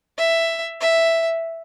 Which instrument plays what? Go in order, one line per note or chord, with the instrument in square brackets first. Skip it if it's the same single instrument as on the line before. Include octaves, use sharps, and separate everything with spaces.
[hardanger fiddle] E5
E5